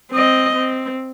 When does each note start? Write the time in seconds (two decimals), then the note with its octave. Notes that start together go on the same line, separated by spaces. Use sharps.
0.12 C4 D#5
0.56 C4